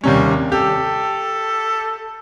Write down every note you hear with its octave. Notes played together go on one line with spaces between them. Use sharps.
D#2 C3 G3 C#4
G4 A4